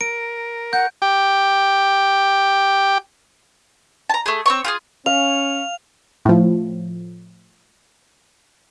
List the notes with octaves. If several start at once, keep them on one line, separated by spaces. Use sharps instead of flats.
A#4 D7
F#5 G6
G4 G5
A5 A#5
A3 G#4
C4 C#5 C#6
F4 G4 G#4
C#4 F5 F7
A2 F3